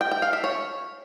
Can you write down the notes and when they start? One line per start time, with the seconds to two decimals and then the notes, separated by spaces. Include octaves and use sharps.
0.01 G5
0.11 G5
0.22 F5
0.33 E5
0.44 C#5